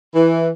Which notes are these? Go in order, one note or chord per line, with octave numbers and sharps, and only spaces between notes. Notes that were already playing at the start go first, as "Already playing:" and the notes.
E3